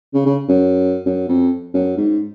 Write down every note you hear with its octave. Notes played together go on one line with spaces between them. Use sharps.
C#3
C#3
F#2
F#2
F2
F#2
G#2